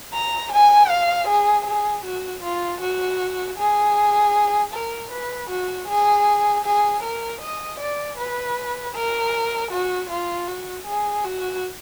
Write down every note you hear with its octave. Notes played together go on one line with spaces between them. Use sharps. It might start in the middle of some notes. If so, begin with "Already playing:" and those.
A#5
G#5
F5
G#4
G#4
F#4
F4
F#4
G#4
A#4
B4
F#4
G#4
G#4
A#4
D#5
D5
B4
A#4
F#4
F4
F#4
G#4
F#4